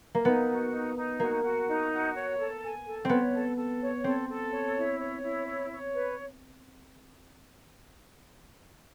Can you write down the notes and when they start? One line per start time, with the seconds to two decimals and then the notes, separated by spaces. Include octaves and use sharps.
0.15 A#3
0.25 B3 D#4
0.48 F#4
0.72 D#4
0.96 D#4
1.20 A#3 F#4
1.44 F#4
1.68 D#4
1.91 F#4
2.15 C#5
2.39 A4
2.63 G#5
2.86 A4
3.05 B3 C4 C#5
3.34 A4
3.57 A4
3.81 C#5
4.04 C4 A4
4.29 A4
4.52 C#5
4.76 E4
4.99 C#5
5.23 E4
5.47 C#5
5.70 C#5
5.94 B4